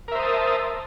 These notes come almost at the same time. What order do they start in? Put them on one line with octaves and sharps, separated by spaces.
A#4 E5 C5 D#6 A5